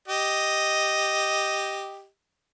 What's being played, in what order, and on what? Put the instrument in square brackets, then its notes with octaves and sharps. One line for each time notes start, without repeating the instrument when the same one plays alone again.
[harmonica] G4 D#5